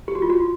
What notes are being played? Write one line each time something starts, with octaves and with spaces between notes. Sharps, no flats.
G4
F#4
F4
F#4